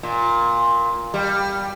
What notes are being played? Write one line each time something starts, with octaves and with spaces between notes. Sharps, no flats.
A#2
G3